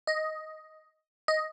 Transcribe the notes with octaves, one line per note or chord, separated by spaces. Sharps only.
D#5
D#5